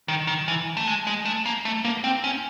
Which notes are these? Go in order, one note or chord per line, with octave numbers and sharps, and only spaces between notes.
D#3
D#3
E3
A3
G#3
G#3
A3
A#3
A3
A#3
C4
C#4